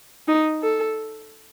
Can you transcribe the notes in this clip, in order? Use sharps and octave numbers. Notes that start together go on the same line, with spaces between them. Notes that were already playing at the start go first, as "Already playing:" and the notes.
D#4
A4